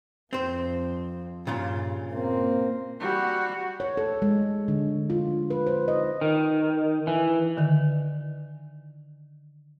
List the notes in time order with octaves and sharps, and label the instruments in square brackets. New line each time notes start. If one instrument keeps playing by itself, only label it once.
[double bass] F2 [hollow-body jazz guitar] C4 C5
[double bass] G2 [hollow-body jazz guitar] A#2 C#3 F4
[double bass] A#3 C4
[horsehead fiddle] G3 F#4
[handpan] C#5
A4
G#3
D3
F4
B4
C5
D#5
[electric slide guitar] D#3
E3
[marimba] D3 D#3